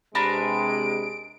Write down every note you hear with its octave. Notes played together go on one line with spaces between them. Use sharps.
C3 G#3 D4 A#4 B4 D7